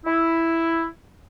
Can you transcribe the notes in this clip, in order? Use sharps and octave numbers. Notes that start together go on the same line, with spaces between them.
E4